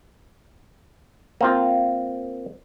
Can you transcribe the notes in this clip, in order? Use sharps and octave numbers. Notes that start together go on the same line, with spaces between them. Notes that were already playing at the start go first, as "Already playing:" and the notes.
A#3 C4 F4